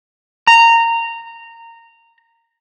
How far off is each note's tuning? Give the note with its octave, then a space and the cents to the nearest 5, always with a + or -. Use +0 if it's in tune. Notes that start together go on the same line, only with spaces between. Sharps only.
A#5 -15